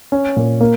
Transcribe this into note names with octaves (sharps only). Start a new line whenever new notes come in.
C#4
A#2
A#3